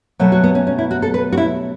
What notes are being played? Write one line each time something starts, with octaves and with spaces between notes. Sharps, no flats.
B2 F#3 A3 B4
F#4
B3
C#4
C#4
E4
F#4
A4
B4
F#4
E4